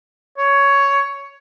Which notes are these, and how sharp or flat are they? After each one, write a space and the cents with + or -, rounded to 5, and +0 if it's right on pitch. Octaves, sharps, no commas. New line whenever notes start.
C#5 +10